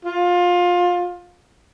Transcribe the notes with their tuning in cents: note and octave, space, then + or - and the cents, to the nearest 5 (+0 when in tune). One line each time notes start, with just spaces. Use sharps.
F4 +20